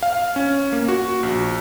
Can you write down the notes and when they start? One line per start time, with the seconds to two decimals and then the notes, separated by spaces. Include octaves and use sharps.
0.03 F5
0.36 C#4
0.73 A#3
0.88 F#4
1.23 A#1